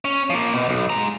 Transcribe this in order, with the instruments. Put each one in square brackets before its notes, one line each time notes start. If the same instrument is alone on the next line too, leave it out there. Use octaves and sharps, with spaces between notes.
[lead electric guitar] C#4
F3 A#3
B2
B1
G#3 A#5